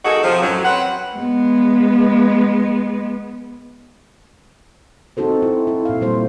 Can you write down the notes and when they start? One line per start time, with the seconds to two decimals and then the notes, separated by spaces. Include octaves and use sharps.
0.04 A#3 D#4 F#4 G#4 A4
0.23 C3 F3
0.41 F#2 A2 F#3
0.64 C4 B4 F#5
1.16 G#3 B3
5.17 C4 D#4 F#4 A4 C5
5.42 E4
5.67 E4
5.85 A#2 F5
6.01 A#2 G3 C5